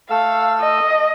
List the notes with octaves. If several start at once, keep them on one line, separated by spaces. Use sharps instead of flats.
A3 A4 F5 E6
D#5